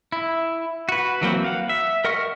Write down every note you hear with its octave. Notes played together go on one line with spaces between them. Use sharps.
E4
F#4 B4
E3 F#3 A#3 C4
F5 F#5
E5
A#4 D#5 F#5 C#6 F6